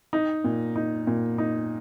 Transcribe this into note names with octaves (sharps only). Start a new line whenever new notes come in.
D#4
A#2
D#4
A#2
D#4